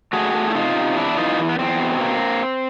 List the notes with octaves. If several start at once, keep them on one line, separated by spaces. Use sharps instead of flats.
A3 F#4 G#4
A3
E4
C3 D#4 F4
C3
E2 D4 E4
E3 D#4 F4
E2
B3
E2 C4
B2
A#3